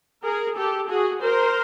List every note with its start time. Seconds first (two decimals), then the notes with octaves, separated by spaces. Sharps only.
0.24 G#4 A#4
0.56 G4 A4
0.88 F#4 G#4
1.21 A#4 C5